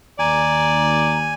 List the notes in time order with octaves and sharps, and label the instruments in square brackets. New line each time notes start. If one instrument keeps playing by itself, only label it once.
[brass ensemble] D#2 [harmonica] D5 [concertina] G#5 [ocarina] A#5